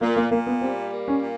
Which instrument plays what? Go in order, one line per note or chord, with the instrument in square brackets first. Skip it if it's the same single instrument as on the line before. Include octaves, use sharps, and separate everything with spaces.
[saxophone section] A#2 [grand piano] A#3
[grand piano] A#3
[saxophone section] A#2 [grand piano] A#3
[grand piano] B3
[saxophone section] G3 [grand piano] C4
[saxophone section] A#3
[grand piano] C#4
[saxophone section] A#2